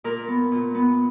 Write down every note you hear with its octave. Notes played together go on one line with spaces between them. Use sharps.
A#2 A#4
B3
A#2
B3